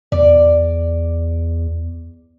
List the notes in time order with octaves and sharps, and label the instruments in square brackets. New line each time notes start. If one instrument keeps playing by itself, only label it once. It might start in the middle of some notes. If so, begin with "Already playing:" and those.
[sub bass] E2 [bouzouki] D5